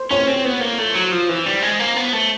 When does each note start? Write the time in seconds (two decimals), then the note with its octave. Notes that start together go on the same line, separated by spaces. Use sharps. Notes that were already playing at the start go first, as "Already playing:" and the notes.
Already playing: C5
0.11 C#4 C#5
0.27 C4
0.45 B3
0.61 A#3
0.79 A3
0.95 F#3
1.12 F3
1.29 E3
1.46 G3
1.62 G#3
1.80 A#3
1.97 B3
2.13 A3